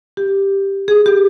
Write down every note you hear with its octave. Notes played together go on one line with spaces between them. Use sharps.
G4
G#4
G4